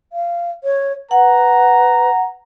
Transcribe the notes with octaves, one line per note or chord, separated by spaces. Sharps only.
F5
C#5
B4 F#5 A#5